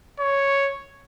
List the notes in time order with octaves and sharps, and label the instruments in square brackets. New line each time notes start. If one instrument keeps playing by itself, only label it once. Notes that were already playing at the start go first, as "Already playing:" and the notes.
[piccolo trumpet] C#5